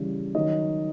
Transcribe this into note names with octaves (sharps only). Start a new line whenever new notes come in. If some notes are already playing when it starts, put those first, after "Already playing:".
Already playing: C#3 E3 G3
D#3 F#3 D#5